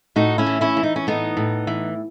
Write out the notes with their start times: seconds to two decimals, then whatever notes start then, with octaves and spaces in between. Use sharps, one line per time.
0.16 A2 D#4 F#4
0.38 C#4 E4
0.46 E3
0.61 C#4 E4
0.77 E3
0.83 D#4
0.96 C#4
1.07 A2 B3 D#4
1.37 A2
1.67 E3